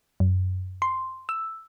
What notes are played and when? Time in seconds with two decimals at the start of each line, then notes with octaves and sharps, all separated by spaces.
0.20 F#2
0.82 C6
1.29 E6